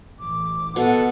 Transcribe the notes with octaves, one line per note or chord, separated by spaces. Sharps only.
A1 D6
B2 A4 F#5